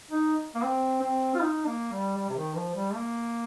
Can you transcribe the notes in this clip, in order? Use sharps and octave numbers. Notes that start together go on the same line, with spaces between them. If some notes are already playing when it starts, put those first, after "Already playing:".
D#4
A#3
C4
C4
F4
D#4
A#3
G3
G3
C3
D#3
F3
G3
A#3